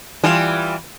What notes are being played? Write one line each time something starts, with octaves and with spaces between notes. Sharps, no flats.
E3 G3 F4